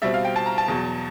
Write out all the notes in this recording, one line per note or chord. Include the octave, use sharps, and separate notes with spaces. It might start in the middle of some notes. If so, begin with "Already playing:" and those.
B2 G3 C4 E5
F5
G5
A5
A#5
A5
E2 B2 F#3